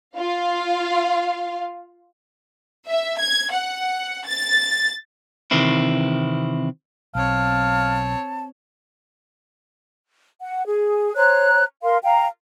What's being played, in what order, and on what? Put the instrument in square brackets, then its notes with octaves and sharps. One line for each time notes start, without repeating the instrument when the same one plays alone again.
[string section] F4 F5
[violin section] E5
G#6
F#5
A6
[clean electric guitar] C3 D#3 E3 C4 E4
[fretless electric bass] B1 [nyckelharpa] C4 C#5 [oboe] F5 [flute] A5
[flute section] F#5
G#4
C5 C#5 A#5 F#6
A#4 F5 C6
F5 G5 A#5